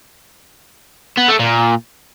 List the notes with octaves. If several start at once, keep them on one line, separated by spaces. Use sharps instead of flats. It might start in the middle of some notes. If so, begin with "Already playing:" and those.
B3
A3
A#2